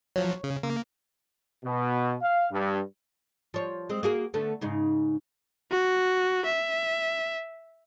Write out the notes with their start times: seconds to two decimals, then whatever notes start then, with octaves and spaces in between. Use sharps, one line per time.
0.16 F3 F#3 C#5
0.44 C#3
0.63 C#3 A#3
1.65 B2
2.22 F5
2.52 G2
3.54 F3 C#5
3.89 G#3 C4
4.03 A#3 F#4 G#4
4.34 D3 A3 B3
4.61 G#2 C#3 D#4
5.71 F#4
6.45 E5